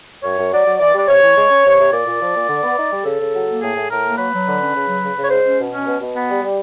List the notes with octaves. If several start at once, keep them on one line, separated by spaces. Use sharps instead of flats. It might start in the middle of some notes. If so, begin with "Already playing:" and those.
F#2 C#5
F#2
F#3 D5
F#3
E3 D5
G3 D5
C3 C#5
E3
G#3
C#4
C3
C3
A#2 D5
A#2
F3
A#2
D3
B3
D#4
G3
C#3 A4
C#3
F#3
A#3
A2 G#4
A2
A2 A#4
A#3
F#3 B4
F#3
D3
C#4
C#3
F#3
C#3
C#3
C#5
G#3 C5
C#4
B2
C#4
B2
B2
B3
G3
G3